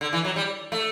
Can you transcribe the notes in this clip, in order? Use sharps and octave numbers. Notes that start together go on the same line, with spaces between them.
D3
E3
F#3
G3
A3